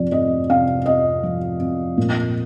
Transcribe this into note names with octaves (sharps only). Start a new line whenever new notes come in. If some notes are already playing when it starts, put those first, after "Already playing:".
Already playing: F2 C3 F3 D5
F2 D#5
C3 F5
F2 D#5
F3
F2
A#2